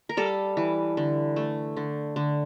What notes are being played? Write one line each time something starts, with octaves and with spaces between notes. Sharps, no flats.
A#4
G3 A4
E3
D3
A3
D3
D3